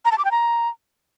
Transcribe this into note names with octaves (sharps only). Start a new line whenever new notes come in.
A#5
A5
D6
G5
A#5